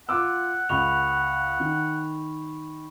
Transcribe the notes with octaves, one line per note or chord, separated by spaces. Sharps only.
F4 F#5 D6 E6
C#2 B5 C#6 F7
D#3